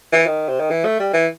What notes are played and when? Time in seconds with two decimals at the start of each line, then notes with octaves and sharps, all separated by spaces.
0.12 E3
0.26 D#3
0.48 C3
0.60 D#3
0.70 E3
0.85 A3
0.99 G3
1.13 E3